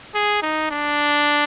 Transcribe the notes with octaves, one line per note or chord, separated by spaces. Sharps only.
G#4
D#4
D4